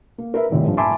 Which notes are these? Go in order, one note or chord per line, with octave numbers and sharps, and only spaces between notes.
A#3
A#4 B4 E5
D#1 G#1 A2
G2 F3
E5 G#5 A5 B5 C6 D6